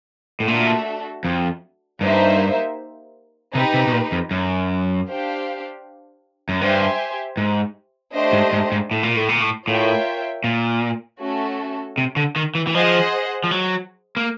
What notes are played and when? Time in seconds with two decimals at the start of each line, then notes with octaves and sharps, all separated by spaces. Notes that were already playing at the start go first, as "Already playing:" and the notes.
0.40 A2
0.47 A#2 A3 D4 F#4 A4
1.24 F2
2.01 G2 A#3 D#4 G4 C5 E5
3.54 C3 D#4 G4 B4
3.74 C3
3.87 B2
3.92 A#2
4.12 F2
4.31 F#2
5.08 D4 G4 C5 F5
6.49 F#2
6.61 G2 G4 C5 E5 G#5
7.37 G#2
8.14 A3 D4 G4 C5 D#5
8.33 G#2
8.53 G#2
8.72 G#2
8.91 A2
9.03 A#2
9.16 A2
9.29 A#2
9.41 A2
9.68 A2 F4 A#4 C#5 E5 G5
10.44 A#2
11.20 A3 C#4 F#4 A4
11.98 C3
12.16 D3
12.36 D#3
12.55 E3
12.67 E3
12.75 F3 G#4 C5 D#5 F#5
13.44 F3
13.51 F#3
14.17 A#3